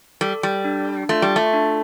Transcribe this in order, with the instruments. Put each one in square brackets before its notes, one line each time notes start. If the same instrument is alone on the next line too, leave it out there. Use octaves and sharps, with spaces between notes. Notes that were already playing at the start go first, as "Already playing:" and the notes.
[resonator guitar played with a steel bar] G3 [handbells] A4
[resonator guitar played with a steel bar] G3
[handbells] D4
[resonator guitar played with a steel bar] A3 [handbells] F4
[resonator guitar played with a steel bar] G3
A3
[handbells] D4